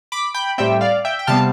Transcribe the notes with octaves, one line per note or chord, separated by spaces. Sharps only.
B5 D6
G5 B5
A2 G3 C4 E5 G5
D5 F5
E5 G5
G5
C3 G3 B3 F5 A5